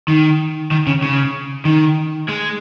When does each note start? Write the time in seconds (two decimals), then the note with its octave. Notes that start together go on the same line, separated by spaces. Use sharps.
0.08 D#3
0.71 D#3
0.87 C#3
1.02 C#3
1.65 D#3
2.28 G#3